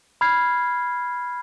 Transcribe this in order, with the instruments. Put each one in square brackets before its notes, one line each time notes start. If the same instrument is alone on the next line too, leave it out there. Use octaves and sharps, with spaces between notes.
[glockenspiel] B5 F6 G#6 C7